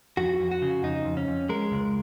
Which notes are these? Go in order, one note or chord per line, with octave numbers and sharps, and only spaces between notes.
F2 F#4
F2
F#4
C#3
F2 D#4
F2
C#4
F2
G#3 A#4
C#2